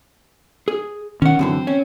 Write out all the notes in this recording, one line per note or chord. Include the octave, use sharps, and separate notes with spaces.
G#4
D#3 C#4 F#5
F#2 D3 E3 C4
C#4